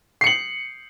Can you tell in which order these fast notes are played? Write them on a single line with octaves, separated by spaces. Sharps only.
C7 C#7 F#7